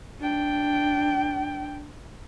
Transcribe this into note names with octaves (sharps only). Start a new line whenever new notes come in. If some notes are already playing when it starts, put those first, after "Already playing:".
D4 G5